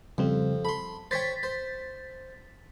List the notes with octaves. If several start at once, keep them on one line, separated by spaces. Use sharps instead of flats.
F2 C#3 G3 C4
A4 B5 C6
C5 C#5 G5 A6 B6
C5